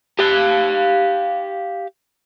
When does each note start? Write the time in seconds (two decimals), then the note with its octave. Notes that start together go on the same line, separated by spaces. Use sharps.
0.19 G4 F5